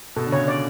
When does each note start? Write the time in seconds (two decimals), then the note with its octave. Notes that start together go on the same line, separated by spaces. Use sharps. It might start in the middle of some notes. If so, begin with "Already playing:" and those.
0.16 B2 A4
0.27 D3
0.32 C#3 C#5
0.48 D5